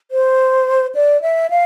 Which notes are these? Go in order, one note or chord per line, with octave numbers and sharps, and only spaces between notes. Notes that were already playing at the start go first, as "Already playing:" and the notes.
C5
D5
E5
F5